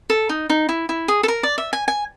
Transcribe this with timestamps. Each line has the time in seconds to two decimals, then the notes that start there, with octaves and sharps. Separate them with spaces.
0.10 A4
0.29 D#4
0.50 D#4
0.69 E4
0.89 E4
1.08 G#4
1.23 A4
1.28 A#4
1.43 D5
1.58 E5
1.73 G#5
1.88 G#5